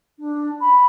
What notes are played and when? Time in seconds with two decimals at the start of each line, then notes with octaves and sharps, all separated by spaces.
0.19 D4
0.60 B5